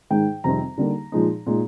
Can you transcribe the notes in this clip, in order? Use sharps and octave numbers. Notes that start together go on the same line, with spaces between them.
G#2 D#3 G#3 D#4 G5
F2 C3 D#3 G3 C4 A#5
D3 G3 A#3 D#4
A#2 F3 G#3 D#4
A#2 G#3 D#4